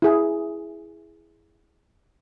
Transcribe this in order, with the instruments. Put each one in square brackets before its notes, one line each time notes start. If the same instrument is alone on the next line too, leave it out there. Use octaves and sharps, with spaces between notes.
[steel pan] E4 G#4